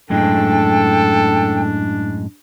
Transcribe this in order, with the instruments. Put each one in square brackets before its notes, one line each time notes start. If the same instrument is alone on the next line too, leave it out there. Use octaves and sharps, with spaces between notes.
[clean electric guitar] F#2 A2 G#3 [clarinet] D4 [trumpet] A4 [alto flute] G5